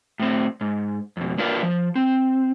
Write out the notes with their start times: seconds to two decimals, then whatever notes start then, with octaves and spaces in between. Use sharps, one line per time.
0.20 A2 C4
0.61 G#2
1.17 F2 B2
1.38 A#3 D4 F4 A#4 B4 F5
1.63 F3
1.95 C4